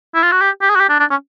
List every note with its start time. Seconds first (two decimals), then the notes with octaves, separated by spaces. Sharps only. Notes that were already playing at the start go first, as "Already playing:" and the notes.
0.14 E4
0.23 F4
0.32 F#4
0.41 G4
0.61 G4
0.70 G#4
0.76 F#4
0.80 G4
0.89 D4
1.00 D4
1.10 C#4